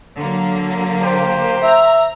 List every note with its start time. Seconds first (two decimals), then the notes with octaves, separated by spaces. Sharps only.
0.16 D3 F#3 A#3
1.03 G4 C5
1.63 E5 A#5